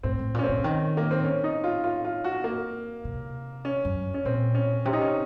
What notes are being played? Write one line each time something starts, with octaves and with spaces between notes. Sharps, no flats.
A2 C4
A2
A#2 C#4
C4
C#3
D#3
A#3
C4
C#4
D#4
F4
F4
F4
F#4
A#3
C3
C#4
F#2
C#4
A#2 C4
C#4
C3 C#4
D#4
C#4